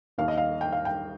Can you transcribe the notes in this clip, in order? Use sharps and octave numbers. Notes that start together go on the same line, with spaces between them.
D#2 D#3 A#3 F5
D#5
F5
G5
F5
G5